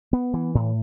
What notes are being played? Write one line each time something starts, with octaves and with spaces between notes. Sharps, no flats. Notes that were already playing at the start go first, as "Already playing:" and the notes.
B3
E3
A2